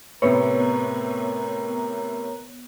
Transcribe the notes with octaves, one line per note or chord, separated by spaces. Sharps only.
A2 C3 B3 A#4 B4 C#5 A#5